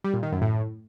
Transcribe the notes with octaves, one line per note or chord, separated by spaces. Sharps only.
G3
A#2
D#3
F#2
A2